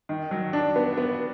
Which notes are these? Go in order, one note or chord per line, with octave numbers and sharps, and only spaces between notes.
D#3
F#3
D4
B3
B3